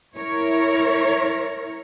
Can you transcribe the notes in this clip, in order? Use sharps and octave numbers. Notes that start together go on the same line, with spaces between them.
E4 A#4 C#5